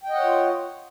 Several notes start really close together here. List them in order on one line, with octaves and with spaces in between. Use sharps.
G5 D#5 F#5 C#5 F4